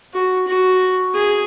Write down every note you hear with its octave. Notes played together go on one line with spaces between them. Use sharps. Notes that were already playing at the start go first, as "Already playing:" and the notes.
F#4
F#4
G#4